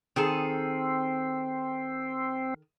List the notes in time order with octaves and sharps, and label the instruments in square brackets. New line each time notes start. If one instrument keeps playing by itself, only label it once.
[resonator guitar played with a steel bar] D#3 G#4 A4 [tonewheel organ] C4